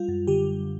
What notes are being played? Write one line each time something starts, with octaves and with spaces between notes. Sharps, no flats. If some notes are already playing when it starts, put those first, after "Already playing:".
Already playing: G3 F4
F#2
D3 G4